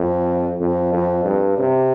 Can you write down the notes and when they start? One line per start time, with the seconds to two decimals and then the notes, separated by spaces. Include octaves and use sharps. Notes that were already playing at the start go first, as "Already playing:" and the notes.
Already playing: F2
0.61 F2
0.93 F2
1.25 G2
1.58 C3